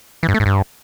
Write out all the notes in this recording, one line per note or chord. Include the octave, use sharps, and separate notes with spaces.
E3
G2
A3
G#2
G2